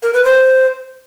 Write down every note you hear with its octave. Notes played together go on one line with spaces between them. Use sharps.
A#4
B4
C5